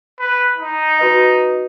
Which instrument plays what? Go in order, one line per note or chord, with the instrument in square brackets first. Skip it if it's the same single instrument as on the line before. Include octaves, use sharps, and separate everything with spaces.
[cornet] B4
D#4
[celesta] F#4 B4 D#5